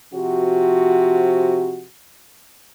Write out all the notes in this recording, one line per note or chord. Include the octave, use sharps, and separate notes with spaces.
C3 F3 F#4